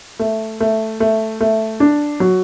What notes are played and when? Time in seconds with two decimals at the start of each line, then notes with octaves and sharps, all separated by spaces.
0.19 A3
0.60 A3
1.00 A3
1.40 A3
1.80 D4
2.20 F#3